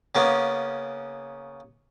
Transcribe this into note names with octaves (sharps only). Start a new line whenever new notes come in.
C#3 A#3 B3 C#4